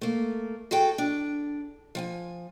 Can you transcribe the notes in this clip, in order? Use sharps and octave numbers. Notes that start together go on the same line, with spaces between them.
A3 A#3
F#4 G#4 A4 G5
D4
F3 G5 G#5